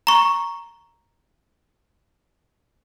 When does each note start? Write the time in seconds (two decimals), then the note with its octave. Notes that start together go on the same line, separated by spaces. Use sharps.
0.07 A#5 C#6